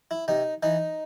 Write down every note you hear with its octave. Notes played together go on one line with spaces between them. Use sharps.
E4
C3 D#4
E3 D#4